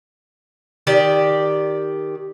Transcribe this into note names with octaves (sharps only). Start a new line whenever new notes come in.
D#3 G4 D5